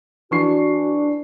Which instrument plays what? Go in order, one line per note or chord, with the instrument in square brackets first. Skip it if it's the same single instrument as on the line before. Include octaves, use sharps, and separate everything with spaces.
[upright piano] E3 C#6 C7 [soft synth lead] D4 [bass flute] F#4